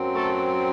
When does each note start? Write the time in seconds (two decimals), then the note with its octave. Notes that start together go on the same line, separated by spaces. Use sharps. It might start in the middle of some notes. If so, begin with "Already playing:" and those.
Already playing: F#2 F#3 C4
0.14 A3 A4